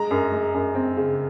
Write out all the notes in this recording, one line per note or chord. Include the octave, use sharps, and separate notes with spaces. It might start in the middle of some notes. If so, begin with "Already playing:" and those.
Already playing: G#3 A#5
F#2
G#3
F#2
C4
C#3